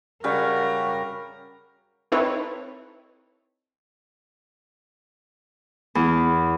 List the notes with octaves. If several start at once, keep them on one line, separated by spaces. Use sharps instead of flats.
C#3 G3 F#4 A#4
C4 D#4 E4 A4 B4 C#5
E2